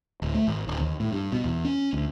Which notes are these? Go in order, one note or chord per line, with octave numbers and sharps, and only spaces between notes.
D1
A3
G#1
D1
D#2
A2
G2
B2
E2
C#4
D2